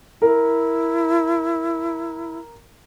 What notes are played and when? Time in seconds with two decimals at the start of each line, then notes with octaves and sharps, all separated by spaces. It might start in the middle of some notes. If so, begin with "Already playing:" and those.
0.22 E4 A#4